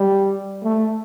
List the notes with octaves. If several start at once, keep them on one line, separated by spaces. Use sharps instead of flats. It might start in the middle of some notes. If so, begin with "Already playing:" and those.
Already playing: G3
A3